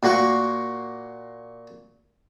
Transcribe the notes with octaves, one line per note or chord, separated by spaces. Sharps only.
A#2 A#3 F#4 F#5 C#6